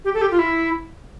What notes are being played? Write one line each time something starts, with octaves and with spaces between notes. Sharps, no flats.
G4
A4
G4
F4
E4